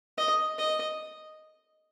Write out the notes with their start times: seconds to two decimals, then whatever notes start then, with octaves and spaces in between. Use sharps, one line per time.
0.18 D#5
0.58 D#5